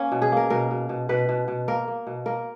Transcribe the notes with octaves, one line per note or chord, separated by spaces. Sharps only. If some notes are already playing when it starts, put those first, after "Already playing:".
Already playing: A#3 C#4
B2
G#4
A#3 A#4
B2 A#4
B2
B2
B2 B4
B2
B2
A#3 A#4
A#3
B2
A#3 A#4